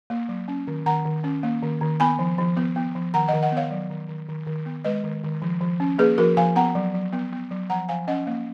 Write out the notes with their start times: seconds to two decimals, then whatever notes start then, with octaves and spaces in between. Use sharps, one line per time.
0.10 A#3
0.29 F#3
0.48 C#4
0.67 D#3
0.86 D#3 F#5 A#5
1.05 D#3
1.24 C#4
1.43 A#3
1.62 D#3
1.81 D#3
2.00 B3 G#5 B5
2.19 F3
2.38 F3
2.57 B3
2.76 B3
2.95 F3
3.14 D#3 F#5 A#5
3.28 D#5 F#5
3.33 D#3
3.43 D#5 F#5
3.52 B3 C#5 F5
3.71 F#3
3.90 D#3
4.08 D#3
4.28 D#3
4.47 D#3
4.66 B3
4.84 G#3 B4 D#5
5.04 D#3
5.23 D#3
5.42 F3
5.61 F3
5.80 C#4
5.99 A#3 G#4 B4
6.18 F3 F#4 A#4
6.37 F3 F5 G#5
6.56 B3 F#5 A#5
6.75 F#3
6.94 F#3
7.13 B3
7.32 B3
7.51 F#3
7.70 F3 F#5 A#5
7.89 F3 F5 G#5
8.08 C#4 D#5 F#5
8.27 A#3